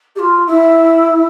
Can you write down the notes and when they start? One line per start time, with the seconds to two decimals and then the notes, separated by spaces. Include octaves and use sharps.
0.15 G4
0.19 F4
0.47 E4